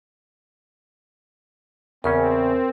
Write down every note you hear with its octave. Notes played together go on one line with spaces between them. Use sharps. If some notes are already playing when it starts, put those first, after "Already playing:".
E2 C#3 C4 C#4 A#4